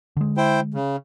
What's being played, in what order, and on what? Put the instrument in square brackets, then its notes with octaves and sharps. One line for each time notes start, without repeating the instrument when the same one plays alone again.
[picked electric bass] D3 G#3
[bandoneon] E4 C5 G5
C#3